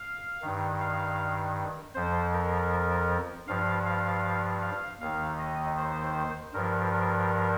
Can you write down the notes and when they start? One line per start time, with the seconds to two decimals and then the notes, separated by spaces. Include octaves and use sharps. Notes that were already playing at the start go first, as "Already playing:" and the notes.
Already playing: F5
0.42 G2 D#3
0.81 F5
1.95 F2 F3 C5
2.33 A#4
3.48 G2 F3 F5
3.86 F5
4.62 F5
5.00 D#2 D#3 F5
5.39 D#5
5.77 C5
6.53 G2 F3 A#4
6.92 A#4